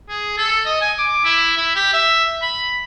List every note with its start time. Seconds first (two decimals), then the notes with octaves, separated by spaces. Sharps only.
0.09 G#4
0.38 A4
0.66 D#5
0.81 G#5
0.98 D6
1.24 E4
1.57 E4
1.76 G4
1.93 E5
2.42 B5